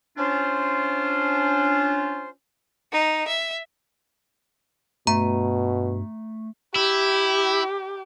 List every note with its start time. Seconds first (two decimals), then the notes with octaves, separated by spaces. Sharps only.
0.17 C#4 D4 F4 C5
2.92 D#4
3.27 E5
5.07 G2 B2 A3 A#5
6.75 E4 G4